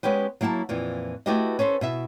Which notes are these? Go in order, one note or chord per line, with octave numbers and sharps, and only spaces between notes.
G#3 B3 C#4 G4 B4
F#3 A#3 E4 G5 A5
F2 A#2 E3
A3 E4 F#4 G4 B4 D#5
C#4 A4 B4 C5
B2 E4 E5